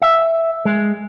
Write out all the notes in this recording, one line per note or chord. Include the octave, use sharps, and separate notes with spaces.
E5
G#3